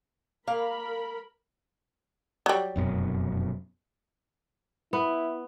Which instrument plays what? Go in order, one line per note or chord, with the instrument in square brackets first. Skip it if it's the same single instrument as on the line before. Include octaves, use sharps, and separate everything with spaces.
[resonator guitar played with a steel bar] A#3 F5 [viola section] A#4 B5
[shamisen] F#3 G3
[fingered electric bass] F1 F#2 B2
[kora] B3 [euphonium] E4